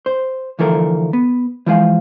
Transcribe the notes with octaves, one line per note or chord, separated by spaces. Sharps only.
C5
D2 E3 F3 A4 A#4
B3
E3 F3 G#3 F5